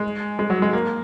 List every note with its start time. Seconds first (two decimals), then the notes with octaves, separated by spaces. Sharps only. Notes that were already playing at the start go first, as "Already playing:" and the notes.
Already playing: G#3
0.39 G#3
0.50 F#3
0.62 G#3
0.73 A#3